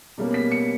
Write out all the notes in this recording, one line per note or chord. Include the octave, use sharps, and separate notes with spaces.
B2 G3 A#3 C#4
B6
C#7